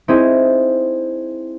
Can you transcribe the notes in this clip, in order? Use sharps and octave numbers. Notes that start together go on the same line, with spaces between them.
C4 D#4 E4 G#4